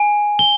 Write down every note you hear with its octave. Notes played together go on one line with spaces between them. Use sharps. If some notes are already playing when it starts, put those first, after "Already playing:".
Already playing: G#5
G7